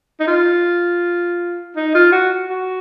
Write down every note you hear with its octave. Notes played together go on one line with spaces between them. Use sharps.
D#4
F4
D#4
F4
F#4
F#4